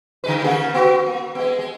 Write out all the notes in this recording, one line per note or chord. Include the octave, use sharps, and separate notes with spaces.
D3 G#3 B4
C#3 A#3 G#4
B3 F#4
A#3
G#3 B3
G#3